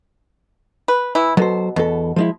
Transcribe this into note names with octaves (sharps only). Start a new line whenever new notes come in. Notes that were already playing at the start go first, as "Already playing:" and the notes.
B4
E3 E4
B2 F#3 A4 C5
E2 B2 A4
F3 G#3 E4